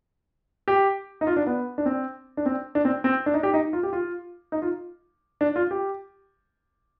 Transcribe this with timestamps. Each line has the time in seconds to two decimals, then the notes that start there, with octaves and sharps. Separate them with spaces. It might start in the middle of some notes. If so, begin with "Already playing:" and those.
0.68 G4
1.21 D#4
1.27 F4
1.36 D4
1.46 B3
1.78 D4
1.86 C4
2.37 D4
2.46 C4
2.75 D4
2.85 C4
3.04 C4
3.26 D4
3.34 D#4
3.43 G4
3.54 D#4
3.73 F4
3.83 G4
3.93 F4
4.52 D#4
4.62 F4
5.41 D4
5.56 F4
5.71 G4